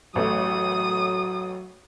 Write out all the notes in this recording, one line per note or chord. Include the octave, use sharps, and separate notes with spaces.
A1 F#3 A3 D#6